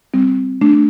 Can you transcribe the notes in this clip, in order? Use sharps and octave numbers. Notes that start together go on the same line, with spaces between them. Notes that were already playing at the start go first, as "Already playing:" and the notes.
G3 C4
A3 D4